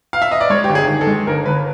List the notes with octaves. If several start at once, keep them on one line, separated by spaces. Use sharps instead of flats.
F5
E5
D#5
D5
G#3 C#5
G1 G4
G#4
D#3
A4
G#3
G1 A#4
G1 B4